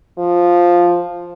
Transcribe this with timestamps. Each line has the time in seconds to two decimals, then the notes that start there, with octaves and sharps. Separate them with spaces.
0.18 F3